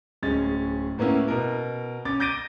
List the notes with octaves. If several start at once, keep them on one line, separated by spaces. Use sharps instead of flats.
D1 G#3 C#4 A6
A2 A#3 B3 C#4 E4
B2 A#4
C#4 D6 A6
D6 G6 A6 A#6 D7 D#7